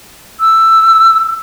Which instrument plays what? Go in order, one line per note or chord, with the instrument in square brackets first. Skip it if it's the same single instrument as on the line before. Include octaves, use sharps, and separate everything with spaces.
[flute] E6